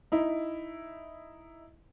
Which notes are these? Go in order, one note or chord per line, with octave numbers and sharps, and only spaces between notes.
D#4 E4